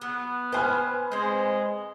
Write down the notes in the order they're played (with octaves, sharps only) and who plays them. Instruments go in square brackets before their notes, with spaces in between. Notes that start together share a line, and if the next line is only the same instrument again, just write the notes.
[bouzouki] F#3 [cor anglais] B3
[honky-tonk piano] B4 G#5 F6 [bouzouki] C5 G5
[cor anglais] G#3 [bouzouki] C4 C5